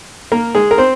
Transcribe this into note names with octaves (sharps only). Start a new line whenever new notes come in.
A#3 A#4
G#3 G#4
A#4
C4 C5